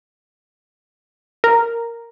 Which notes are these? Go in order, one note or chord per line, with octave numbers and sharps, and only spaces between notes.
A#4